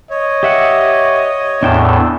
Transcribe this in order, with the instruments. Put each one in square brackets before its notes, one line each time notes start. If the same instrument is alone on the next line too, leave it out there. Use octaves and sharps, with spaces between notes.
[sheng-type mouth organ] C#5 [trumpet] D#5
[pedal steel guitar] G4 E5 F#5
[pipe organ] E2 A2 [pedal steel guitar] D4 G5 A5